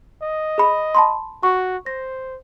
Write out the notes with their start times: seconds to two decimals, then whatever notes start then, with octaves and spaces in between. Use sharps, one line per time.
0.22 D#5
0.58 G#4 B5
0.95 A5 B5 C6
1.43 F#4 C#6
1.86 C5 A#6